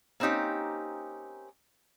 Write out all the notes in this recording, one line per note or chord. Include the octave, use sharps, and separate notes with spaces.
A#3 C4 C#4 D#4 G4